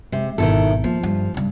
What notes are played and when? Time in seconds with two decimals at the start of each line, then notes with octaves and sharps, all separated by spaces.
0.12 C3 G#3
0.38 G#1 B2 D#3 E4 A4
0.84 F3 A#3
1.03 G2
1.34 G2 C#3